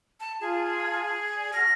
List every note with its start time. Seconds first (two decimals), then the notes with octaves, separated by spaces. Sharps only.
0.20 A5
0.41 F4 G#4 A5
1.35 D5 G#5
1.53 F#4 A5 F6 A#6